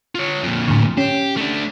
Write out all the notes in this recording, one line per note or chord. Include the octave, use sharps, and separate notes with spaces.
F4 C#5
F2 A#2
A2 D3
C#4 G4
A3 D4